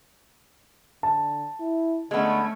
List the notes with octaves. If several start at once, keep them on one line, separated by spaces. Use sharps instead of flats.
D3 A5
E4
D3 G#3 A3 B3 C#4